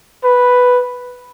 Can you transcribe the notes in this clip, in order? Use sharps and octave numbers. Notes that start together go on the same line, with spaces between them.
B4